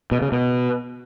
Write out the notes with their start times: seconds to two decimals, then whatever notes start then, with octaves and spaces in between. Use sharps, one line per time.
0.12 B2
0.22 C#3
0.32 B2